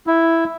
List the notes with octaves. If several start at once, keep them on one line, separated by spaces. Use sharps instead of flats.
E4